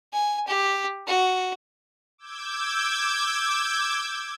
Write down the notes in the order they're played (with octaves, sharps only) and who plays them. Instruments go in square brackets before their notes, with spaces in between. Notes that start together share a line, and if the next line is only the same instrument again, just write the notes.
[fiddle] G#5
G4
F#4
[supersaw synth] D6 E6 G6 G#6